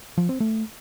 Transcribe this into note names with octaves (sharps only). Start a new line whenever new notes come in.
F3
C4
A3